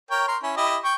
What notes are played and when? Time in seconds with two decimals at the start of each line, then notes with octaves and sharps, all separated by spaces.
0.11 A#4 C#5 G5
0.28 A#4 C6
0.43 C#4 E4
0.57 E4 G4 D#5
0.84 G5 C#6